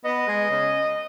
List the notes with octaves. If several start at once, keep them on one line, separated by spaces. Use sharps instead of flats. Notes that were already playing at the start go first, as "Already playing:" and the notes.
B3 D#5
G#3
C#3